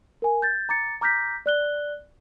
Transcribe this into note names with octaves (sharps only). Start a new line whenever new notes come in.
A#4 G#5
G6 A6
A#5 D6 A6 C#7
A#5 D6 F6 G6 A#6 B6
D5 F#6 G7